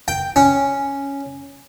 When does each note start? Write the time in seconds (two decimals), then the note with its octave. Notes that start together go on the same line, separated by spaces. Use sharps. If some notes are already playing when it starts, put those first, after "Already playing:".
0.08 G5
0.36 C#4